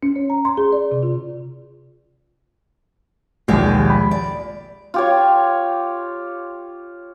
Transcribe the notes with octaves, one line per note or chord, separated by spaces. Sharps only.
C#4
C#5
A#5
C6
G#4
D5
C3
F4
A#1 D#2 B2 G#3 G4
B5
D5
F4 G4 C#5